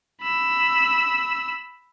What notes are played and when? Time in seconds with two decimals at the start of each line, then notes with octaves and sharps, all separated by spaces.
0.22 B5 E6